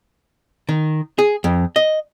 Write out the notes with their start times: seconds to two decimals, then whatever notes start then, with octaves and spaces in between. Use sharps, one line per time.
0.69 D#3
1.19 G#4
1.44 F2
1.76 D#5